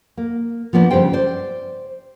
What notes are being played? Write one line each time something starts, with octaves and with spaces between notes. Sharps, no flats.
A#3
F3 A#3 B3 C#4 D4
G2 C#3 G4 C5 G5
C5 D5